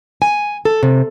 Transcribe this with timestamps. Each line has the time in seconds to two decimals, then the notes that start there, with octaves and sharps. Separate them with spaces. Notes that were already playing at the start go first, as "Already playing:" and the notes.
0.22 G#5
0.65 A4
0.83 C3